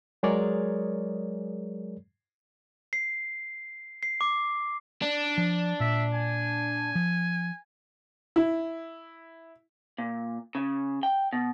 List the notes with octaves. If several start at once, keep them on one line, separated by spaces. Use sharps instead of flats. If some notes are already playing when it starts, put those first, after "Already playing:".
F#3 G#3 G#4 A#4 C#5 D5
C7
C7
D6
D4
F3
A#2 E5
G#5
F3
E4
A#2
C#3
G5
B2